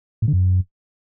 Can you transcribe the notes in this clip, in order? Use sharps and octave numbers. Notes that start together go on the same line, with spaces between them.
A2
D3
F#2